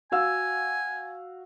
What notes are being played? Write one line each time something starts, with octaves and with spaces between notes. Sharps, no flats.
F#4 F5 G#5 E6